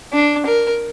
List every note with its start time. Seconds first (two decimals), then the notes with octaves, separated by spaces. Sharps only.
0.13 D4
0.46 A#4